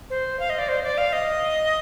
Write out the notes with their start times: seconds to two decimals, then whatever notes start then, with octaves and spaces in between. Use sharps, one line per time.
0.10 C5
0.40 F5
0.50 D#5
0.59 D5
0.69 C5
0.84 D5
0.98 F5
1.13 D#5